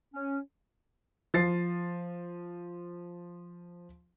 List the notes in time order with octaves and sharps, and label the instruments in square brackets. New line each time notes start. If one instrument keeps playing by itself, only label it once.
[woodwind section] C#4
[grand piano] F3 A6 C7